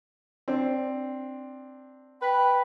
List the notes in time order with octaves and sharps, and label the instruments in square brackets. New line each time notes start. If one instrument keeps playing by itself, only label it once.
[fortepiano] C4 D4
[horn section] B4 B5 [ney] G5